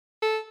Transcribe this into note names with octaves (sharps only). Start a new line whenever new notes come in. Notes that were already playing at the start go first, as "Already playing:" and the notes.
A4